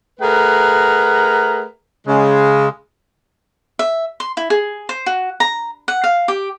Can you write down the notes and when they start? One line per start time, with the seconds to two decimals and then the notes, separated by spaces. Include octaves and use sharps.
0.20 A3 G#4 A#4 B4 F#5 A#5
2.07 C#3 G#3
3.79 E5
4.20 C6
4.37 E4
4.50 G#4
4.89 C5
5.06 F#4
5.40 A#5
5.88 F#5
6.04 F5
6.28 G4